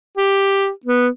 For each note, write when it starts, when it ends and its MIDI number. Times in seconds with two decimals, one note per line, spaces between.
0.17 0.69 67
0.85 1.08 59